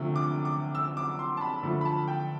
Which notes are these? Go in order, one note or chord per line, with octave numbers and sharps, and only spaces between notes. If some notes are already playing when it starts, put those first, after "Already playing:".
Already playing: D2 C3 F3 A3
D6
D6
E6
D6
C6
A5
B5
D2 D3 F3 A3 B5
B5
A5
G5